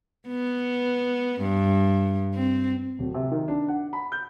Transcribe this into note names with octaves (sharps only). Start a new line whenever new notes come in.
B3
G2
C4
D1
C3
D#3
D4
F#5
B5
G6